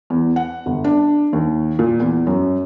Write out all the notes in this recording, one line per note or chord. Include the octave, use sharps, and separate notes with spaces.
E2
F#5
G1
D4
D#2
A#2
E2
F#2